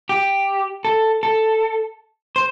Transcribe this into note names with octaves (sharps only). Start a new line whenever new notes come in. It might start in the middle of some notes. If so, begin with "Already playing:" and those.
G4
A4
A4
C5